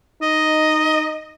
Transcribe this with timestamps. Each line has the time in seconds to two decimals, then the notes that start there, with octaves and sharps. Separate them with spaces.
0.22 D#4 D#5